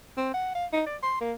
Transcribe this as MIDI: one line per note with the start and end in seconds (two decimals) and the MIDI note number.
0.17 0.31 60
0.34 0.51 78
0.55 0.66 77
0.73 0.83 63
0.86 0.97 74
1.03 1.16 84
1.21 1.33 58